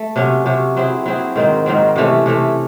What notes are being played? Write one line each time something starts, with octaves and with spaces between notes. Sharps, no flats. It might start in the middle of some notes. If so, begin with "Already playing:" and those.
Already playing: A3
C3 F#3 C#4
C3 F#3 C#4
F#3 C4 E4 G#4
F#3 C4 E4 G#4
G#2 D#3 F#3 C4
G#2 D#3 F#3 C4
C3 E3 A3 C#4
C3 E3 A3 C#4